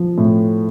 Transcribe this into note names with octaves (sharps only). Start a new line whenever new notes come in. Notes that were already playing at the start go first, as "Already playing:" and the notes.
Already playing: F3
A2